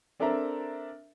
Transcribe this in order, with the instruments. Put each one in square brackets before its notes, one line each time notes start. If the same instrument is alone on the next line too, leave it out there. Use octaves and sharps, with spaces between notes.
[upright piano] C4 D4 A4 A#4 E5 A#5